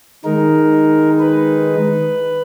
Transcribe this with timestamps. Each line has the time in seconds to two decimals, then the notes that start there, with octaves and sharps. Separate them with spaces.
0.25 D#3 G#3 D#4 A#4
1.20 B4